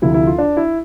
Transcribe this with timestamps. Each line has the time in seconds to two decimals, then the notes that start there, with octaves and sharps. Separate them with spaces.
0.02 D2 C3 F3 E4
0.14 E4
0.27 F4
0.38 D4
0.57 E4